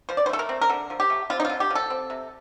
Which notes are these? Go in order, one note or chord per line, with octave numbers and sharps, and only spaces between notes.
F3 C5
D5
C5
A3 A4
A#4
C4
A#4
D3 A4
F3
G4
A3
C4 F4
D#4
D3 F4
G4
F3 A4
C4
C3